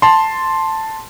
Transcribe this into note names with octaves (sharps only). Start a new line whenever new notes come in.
A5 C6